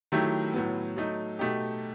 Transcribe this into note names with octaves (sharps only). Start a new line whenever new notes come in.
D#3 F#3 A3 E4 G4
A2 F#3 B3
F#3 A3 D#4
B2 A3 D#4 G4